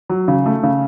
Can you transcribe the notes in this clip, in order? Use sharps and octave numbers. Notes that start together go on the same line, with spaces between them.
F#3
C#3
A3
C#3